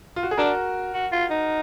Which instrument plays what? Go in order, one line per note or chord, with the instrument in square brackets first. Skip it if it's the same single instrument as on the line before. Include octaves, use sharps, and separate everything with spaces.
[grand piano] F4
F#4
G#4
[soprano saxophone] D4 [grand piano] F#4 A#4
[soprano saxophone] F#4
F4
D#4